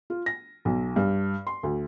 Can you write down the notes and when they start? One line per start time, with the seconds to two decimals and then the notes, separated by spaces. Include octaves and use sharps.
0.10 F4
0.26 A#6
0.65 B1
0.96 G2
1.47 C6
1.63 D2